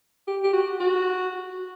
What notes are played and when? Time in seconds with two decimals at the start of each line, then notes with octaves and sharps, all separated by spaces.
0.27 G4
0.44 G4
0.53 F#4
0.80 F#4